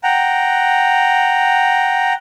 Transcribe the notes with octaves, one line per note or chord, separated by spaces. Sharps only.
F#5 G5 A#5